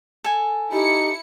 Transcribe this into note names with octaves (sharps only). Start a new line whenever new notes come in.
A4 G#5
D#4 E4 G4 C#7